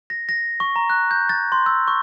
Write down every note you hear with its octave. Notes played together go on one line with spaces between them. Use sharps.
A#6
A#6
C#6
A#5
F#6
G6
A6
C6
E6
C#6